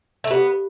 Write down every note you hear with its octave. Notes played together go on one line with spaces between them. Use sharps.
A3
B3 G4